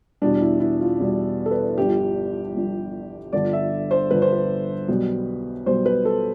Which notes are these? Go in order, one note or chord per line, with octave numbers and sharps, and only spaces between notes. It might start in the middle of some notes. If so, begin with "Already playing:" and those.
E2 B2 G3 D4
E4
E4
F4
E2 B2 G3
A4
B4
G1 G2 F3 G4
G1 G2 F3
G1 G2 D3 F3 D5
E5
C5
G1 G2 D3 F3 B4
C5
B4
B1 B2 G3
B1 B2 G3 C5
B4
A4